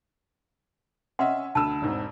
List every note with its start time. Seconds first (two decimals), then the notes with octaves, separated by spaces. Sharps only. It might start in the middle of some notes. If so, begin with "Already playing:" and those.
1.19 C#4 D#5 E5 F#5 C6
1.55 D2 A5 B5 E6
1.82 E1 G#2 C4